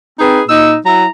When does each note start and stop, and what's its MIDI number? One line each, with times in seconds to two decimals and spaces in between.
0.19 0.40 60
0.19 0.42 63
0.19 0.42 68
0.19 0.42 71
0.49 0.76 46
0.49 0.76 63
0.49 0.73 88
0.86 1.05 54
0.86 1.05 64
0.86 1.08 82